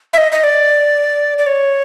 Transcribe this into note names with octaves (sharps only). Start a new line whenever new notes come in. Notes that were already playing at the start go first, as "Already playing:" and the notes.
E5
D#5
D#5
D5
D5
C#5